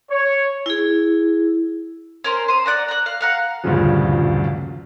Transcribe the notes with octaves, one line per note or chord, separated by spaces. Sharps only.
C#5
E4 G#4
C#4 A#4 C5
C5 D#6
D5 F#5 A#5
A#5 F#6
F5
F5 F#5 A#5
D#1 D2 G2 C#3 F3